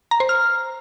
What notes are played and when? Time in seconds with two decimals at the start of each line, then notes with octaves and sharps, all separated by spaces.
0.11 A#5
0.20 C5
0.29 F6